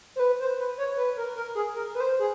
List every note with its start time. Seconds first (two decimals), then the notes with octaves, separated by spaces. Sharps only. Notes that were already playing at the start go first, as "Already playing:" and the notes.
0.16 C5
0.20 B4
0.39 C5
0.58 B4
0.78 C#5
0.97 B4
1.17 A#4
1.36 A#4
1.55 G#4
1.74 A#4
1.95 B4
2.00 C5
2.19 G#4